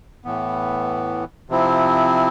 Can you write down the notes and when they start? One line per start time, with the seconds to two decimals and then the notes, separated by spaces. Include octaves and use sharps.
0.24 A2 E3 B3
1.49 C3 F3 C4 E4